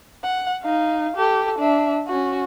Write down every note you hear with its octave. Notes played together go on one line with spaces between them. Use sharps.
F#5
D#4 F5
G4 A4
D4 E5
C#4 F#4